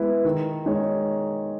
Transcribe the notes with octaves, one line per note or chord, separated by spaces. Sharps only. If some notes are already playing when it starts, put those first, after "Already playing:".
Already playing: G#3 B3 E4 B4
D#3
G#3 D#4 G#4 C#5